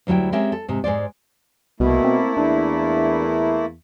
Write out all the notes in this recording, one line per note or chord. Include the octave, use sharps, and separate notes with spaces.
D2 F#3 G3 E4 G5
G#3 C4 C#4 G4 A#4 E5
A4
G#2 C3
G#2 G#3 C5 D5
C2 B2 A3 A#3 E4
C4
E2 D4